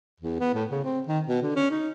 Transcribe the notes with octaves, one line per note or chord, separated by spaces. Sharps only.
E2
B3
A2
C#3
C4
D#3
B2
D3
C#4
D#4